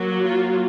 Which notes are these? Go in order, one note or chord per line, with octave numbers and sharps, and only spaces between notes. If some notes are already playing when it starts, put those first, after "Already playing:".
Already playing: F#3 A#3 F#4
F4